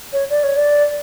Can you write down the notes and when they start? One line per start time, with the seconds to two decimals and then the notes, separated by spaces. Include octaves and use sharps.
0.13 C#5
0.30 D5
0.44 C#5
0.57 D5